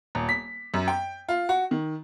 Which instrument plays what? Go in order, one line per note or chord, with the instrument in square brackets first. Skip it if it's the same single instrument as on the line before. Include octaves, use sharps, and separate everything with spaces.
[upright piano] D#1
B6
F#2
G5
F4
F#4
D#3